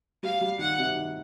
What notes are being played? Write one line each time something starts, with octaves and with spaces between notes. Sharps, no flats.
G3 F5
G3
D#3 F#5
C3
D#3